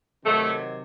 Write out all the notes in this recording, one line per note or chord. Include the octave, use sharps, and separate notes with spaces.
C3 D#3 F#3 A3